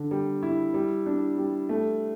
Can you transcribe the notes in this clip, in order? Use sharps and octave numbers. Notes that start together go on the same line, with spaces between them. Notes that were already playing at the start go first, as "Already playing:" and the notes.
Already playing: D3
G3
E4
G3
D4
G3
A3